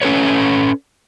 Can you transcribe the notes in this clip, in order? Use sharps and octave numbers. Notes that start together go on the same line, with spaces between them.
C#4 A4 B4 C#5